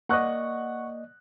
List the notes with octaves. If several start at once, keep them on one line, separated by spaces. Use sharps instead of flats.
A#3 D5 D#5 F#5 C#6 F#6